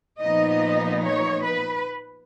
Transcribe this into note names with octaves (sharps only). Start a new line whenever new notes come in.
A#2 F3 B3 D#4 D#5
C#5
B4